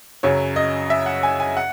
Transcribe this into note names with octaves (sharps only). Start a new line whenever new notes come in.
F#2 C#3 F#3 C#5
D#5
E5
F#5
G#5
G#5
F#5